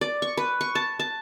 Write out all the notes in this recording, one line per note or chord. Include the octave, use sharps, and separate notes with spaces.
D5
C#6
B4
C#6
A5
A5